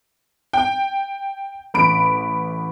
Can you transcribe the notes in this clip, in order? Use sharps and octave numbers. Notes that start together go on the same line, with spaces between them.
G5
A1 B5 D7